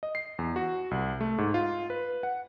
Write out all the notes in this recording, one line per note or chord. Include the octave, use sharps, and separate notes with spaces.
D#5
C7
E2
F#4
C2
A3
G#2
F4
B4
F#5